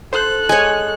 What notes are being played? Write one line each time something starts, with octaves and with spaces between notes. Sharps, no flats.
A4 C5 F#6
G#3 C#5 G#5